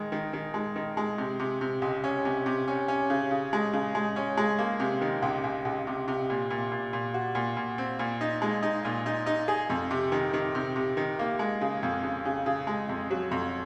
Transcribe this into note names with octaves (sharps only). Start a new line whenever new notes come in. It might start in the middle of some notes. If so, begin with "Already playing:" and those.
Already playing: D#3 G#3
D#3
D#3
G#3
D#3
G#3
C3
C3
C3
C#2
C#4
C3
C3
C#4
C#4
C#3
C#3
G#3
C#3
G#3
C#4
G#3
A#3
C3
D#3
C#2
C#2
C#2
C3
C3
A#2
A#2
A#2
A#2
F#4
A#2
A#2
C4
A#2
D#4
G#3
D#4
A#2
D#4
D#4
G#4
F2
C3
D#3
D#3
C3
C3
D#3
A#3
G#3
C#3
F2
C#3
C#3
C#3
G#3
F2
F#3
F2